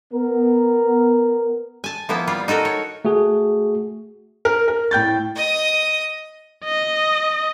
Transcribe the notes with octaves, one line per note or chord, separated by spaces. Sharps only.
B3 A#4
G#5 A5
F3 A#3 B3 E4
G3 F4
D#4 F#4 A4 A#4
C#5
A3 F#4 G#4
A#4
A#4
A2 G5 G6 A6
D#5 D#6
D#5